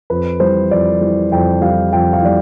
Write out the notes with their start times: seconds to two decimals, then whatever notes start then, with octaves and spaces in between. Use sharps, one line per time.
0.10 F2 B4
0.40 E3 G3 C5
0.71 F2 D5
1.01 E3 G3
1.32 F2 G5
1.62 E3 G3 F5
1.92 F2 G5
2.13 F5
2.22 E3 G3 D5